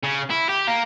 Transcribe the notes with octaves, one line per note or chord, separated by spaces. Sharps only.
C#3
E4
G4
A#3